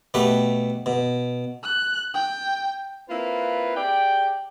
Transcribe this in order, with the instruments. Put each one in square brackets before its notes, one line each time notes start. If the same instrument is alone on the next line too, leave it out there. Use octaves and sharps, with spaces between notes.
[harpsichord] B2 A3 G4 B4
B2
[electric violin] F#6
G5
[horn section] A#3 C4 E4 F4 B4
G4 G#4 D5 G5